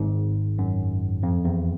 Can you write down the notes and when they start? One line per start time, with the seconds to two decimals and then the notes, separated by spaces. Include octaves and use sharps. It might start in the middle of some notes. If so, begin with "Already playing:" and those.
Already playing: G#1 G#2
0.58 F#2
1.23 F2
1.45 E2